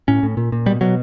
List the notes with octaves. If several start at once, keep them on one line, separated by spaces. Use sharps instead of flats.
A2 C#4
A2
A#2
A#2
B2 G3
B2 F#3